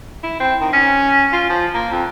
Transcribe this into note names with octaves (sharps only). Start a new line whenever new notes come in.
E4
C4
D#3
C#4
F4
F3
A#3
F2